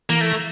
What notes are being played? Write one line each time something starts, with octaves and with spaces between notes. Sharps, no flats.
E3 A#3
A3